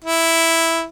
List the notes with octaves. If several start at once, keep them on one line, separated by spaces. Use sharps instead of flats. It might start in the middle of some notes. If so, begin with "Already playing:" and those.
E4